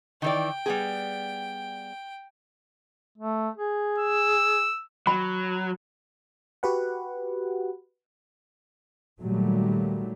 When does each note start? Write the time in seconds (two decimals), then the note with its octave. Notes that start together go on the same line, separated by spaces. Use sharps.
0.22 D#3 E3 D5 G5
0.66 G3 B3 G#4
3.18 A3
3.57 G#4
3.99 E6
5.07 F#3 B5
6.63 F#4 G4 B4 F#5
9.21 A#2 D#3 F#3 G3 A3